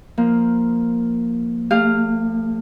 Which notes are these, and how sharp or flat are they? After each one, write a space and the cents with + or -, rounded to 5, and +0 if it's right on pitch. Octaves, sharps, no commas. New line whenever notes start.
F3 +0 A#3 +0
A3 +40 G4 +45 F5 +0